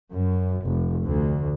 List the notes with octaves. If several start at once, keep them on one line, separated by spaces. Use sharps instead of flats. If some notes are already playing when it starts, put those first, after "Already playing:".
F#2
F1
D2